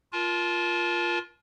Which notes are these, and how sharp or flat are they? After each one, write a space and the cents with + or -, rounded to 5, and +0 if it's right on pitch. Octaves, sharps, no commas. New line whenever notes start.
F4 +0 A#4 +25 A5 -30